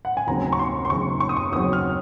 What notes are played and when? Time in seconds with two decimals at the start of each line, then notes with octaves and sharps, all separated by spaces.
0.05 F#5
0.17 G#5
0.27 D#2 C#3 F#3 C4 A#5
0.53 C#6
0.59 C6
0.85 C6
0.90 D#2 C#3 F#3 C4 C#6
1.20 C#6
1.29 D#6
1.37 C#6
1.52 D#2 C#3 F#3 C4 D#6
1.73 F6